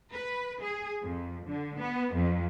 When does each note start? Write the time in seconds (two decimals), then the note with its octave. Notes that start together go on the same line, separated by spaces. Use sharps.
0.12 B4
0.61 G#4
1.03 F2
1.47 D3
1.78 B3
2.14 F2